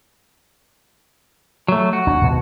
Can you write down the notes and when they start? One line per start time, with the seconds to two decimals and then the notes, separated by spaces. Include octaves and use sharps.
1.68 F#3 A3
1.93 F#4
2.07 D2 D4
2.22 D#2 B2